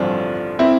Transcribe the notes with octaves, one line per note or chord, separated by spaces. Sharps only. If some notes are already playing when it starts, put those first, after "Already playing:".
Already playing: A1 G2 D3 F3 C4 D4 F4
C4 E4